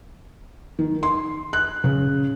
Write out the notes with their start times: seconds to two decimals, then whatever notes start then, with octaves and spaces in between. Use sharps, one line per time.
0.79 D#3
1.03 C6
1.53 F#6
1.84 C#3